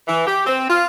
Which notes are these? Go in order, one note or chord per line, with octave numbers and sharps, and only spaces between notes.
E3
G4
C4
F4